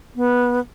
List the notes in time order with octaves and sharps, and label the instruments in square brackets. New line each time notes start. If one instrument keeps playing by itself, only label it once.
[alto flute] B3